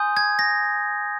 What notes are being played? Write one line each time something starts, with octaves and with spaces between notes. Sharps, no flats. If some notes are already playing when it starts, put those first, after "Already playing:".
Already playing: G#5 C6 D#6 G6
G#6
A#6